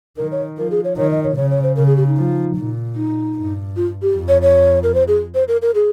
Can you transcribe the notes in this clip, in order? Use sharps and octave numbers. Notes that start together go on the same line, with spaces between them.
D#3 A#4
C#5
F3 A#4
G#4
C#5
D#3 C#5
D#5
C#5
C#3 C#5
C#5
C5
C#3 A#4
G#4
G4
D#4
F3
A#2
D#4
G2
F4
G4
F2
C#5
C#5
A#4
C5
G#4
C5
A#4
A#4
G#4